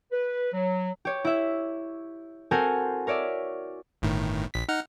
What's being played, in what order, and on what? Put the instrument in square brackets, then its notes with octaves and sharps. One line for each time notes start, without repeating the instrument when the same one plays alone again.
[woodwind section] B4
F#3
[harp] G4 C#5
E4 E5
C4 F#4 A4 A#4 C5 G#5
A#4 C#5 D5 E5
[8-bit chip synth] G1 A2 D#3
A#1 B6
D#4 F#5 F6